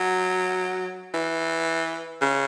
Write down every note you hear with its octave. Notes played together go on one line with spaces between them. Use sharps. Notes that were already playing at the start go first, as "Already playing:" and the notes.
Already playing: F#3
E3
C#3